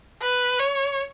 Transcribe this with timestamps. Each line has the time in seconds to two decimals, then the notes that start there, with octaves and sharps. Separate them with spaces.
0.22 B4
0.59 C#5